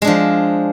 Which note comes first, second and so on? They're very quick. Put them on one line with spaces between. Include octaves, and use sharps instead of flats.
G#3 D4 F3